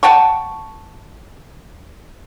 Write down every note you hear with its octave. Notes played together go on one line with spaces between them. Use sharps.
F#5 G5 A5 C#6